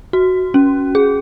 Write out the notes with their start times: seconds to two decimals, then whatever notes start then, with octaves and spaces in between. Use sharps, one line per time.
0.13 F#4
0.54 C#4
0.95 G#4